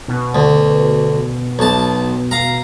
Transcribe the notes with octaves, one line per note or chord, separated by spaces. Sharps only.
B2
D2
B1 A5
F5 A#5